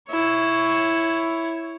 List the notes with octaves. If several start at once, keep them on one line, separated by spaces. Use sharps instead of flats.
E4 C#5